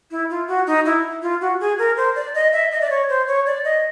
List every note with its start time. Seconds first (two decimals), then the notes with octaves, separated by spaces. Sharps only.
0.11 E4
0.30 F4
0.48 F#4
0.67 D#4
0.85 E4
1.22 F4
1.41 F#4
1.60 G#4
1.78 A#4
1.97 C5
2.15 D5
2.34 D#5
2.53 E5
2.71 D#5
2.81 D5
2.90 C#5
3.09 C5
3.27 C#5
3.46 D5
3.64 D#5